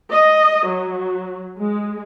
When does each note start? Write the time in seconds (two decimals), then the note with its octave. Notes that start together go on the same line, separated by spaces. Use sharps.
0.12 D#5
0.69 F#3
1.58 G#3